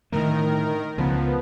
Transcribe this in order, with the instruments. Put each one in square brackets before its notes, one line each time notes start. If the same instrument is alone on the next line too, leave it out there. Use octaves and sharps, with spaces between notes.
[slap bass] A2 D3 A3 [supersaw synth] D#3 A#4
[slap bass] C#2 C#3 [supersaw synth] F3 B3